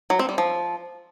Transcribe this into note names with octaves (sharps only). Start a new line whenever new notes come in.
F#3
C4
G3
F3